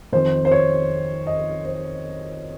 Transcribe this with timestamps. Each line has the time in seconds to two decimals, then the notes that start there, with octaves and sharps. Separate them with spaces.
0.12 F2 D#3 C5
0.45 C5
0.51 C#5
1.27 D#5
1.65 C5